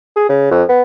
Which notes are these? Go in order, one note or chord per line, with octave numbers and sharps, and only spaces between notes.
G#4
C#3
F2
B3